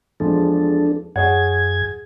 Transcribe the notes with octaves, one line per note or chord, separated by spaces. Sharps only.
E2 F3 G#3 D4 A4
F#2 G#4 C#5 F#5 G#6